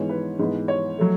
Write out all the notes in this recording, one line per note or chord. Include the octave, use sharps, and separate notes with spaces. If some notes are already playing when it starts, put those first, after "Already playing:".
Already playing: G#2 E3 G#3 B3 C#5
B4
G#2 E3 B3
C#5
F#3 A3